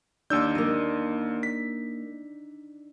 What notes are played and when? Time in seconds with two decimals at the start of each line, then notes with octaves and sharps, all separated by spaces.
0.30 D#2 D4 D#4 D5 E6 G6
0.55 A#3 D#5
1.43 B6